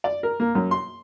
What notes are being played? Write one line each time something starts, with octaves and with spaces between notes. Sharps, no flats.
D5
A#4
A#3
F#2
C6